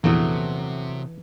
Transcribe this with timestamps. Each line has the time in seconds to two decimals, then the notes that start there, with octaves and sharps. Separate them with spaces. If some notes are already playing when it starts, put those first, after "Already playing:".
0.04 A#1 E2 C3 E3 F#3 A3 B3